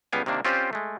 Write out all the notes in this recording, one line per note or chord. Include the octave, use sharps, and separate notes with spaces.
C#2 G3 B3 F5 G5 G#5
C3 D#3 A#3 D4
C4 C#4 F4 G4 C5 D5
G#3 A3